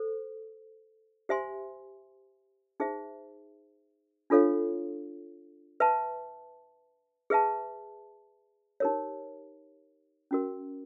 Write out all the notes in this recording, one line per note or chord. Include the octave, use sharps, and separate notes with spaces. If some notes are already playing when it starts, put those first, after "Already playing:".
Already playing: A4 C5
G4 C5 E5 G#5 C6
D#4 G#4 C5 E5
D4 F4 A4 C#5 F5
B4 E5 A5
G#4 B4 E5 A5
D#4 G4 A#4 C#5
C#4 F#4 A#4